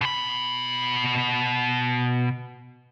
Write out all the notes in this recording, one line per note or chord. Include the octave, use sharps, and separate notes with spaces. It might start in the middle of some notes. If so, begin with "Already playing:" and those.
B2 B5